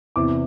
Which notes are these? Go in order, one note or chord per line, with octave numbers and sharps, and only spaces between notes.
E2 C3 E3 D6